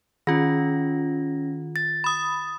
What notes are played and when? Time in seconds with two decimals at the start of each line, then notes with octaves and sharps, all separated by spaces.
0.27 D#3 C#4 F4 A#6
1.76 A6
2.04 B5 D#6